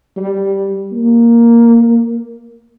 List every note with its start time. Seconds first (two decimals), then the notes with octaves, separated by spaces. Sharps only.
0.17 G3
0.92 A#3